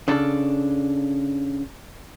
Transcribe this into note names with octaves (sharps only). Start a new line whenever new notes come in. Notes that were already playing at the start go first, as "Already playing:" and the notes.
C#3 D4 A4